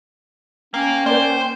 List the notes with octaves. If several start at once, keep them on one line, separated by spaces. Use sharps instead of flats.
A#3 C#4 G5
A#3 C5 D5